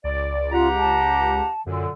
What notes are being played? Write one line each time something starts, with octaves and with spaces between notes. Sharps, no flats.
C#2 D5
F4 G4 F#5 A#5
A5
F#2 A#2 D3